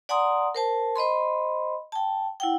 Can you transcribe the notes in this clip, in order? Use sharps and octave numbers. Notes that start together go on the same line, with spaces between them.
D5 F#5 G#5 A#5 C6 D#6
A#4 C5 A5
C5 D#5 B5 C6
G5 A5
E4 F#5 G5